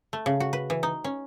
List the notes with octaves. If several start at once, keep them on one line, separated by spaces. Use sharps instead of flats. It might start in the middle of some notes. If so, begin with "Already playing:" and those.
A3
C#3
F#4
B4
E3
D#4
C#4